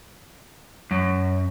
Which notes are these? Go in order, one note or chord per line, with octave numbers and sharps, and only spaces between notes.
F#2